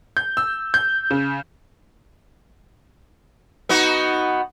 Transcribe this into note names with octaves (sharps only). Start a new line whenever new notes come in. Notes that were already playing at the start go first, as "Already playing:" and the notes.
G6
E6
G6
C#3
B3 D#4 F#4